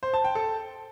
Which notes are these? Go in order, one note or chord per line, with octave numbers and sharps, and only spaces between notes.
C5
A5
G5
A4